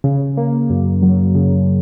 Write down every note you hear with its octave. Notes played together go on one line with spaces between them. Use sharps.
C#3
A#3
F#2
F#3
C#3